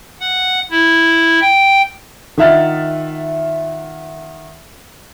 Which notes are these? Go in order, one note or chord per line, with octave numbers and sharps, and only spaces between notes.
F#5
E4
G5
D#3 F4 E5 F#5 F6 A6